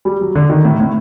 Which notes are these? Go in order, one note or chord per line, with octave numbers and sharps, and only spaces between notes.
G3
F#3
D3
D#3
A2
A2